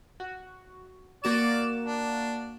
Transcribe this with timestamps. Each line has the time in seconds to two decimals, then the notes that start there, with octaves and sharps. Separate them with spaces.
0.20 F#4
1.24 A#3 F#4 D5 E7
1.85 D4